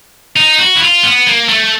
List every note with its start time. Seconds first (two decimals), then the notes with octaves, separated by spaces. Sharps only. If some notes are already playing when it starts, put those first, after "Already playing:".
0.36 D#4
0.58 F#4
0.76 E4
0.81 F4
1.03 B3
1.27 A#3
1.49 A3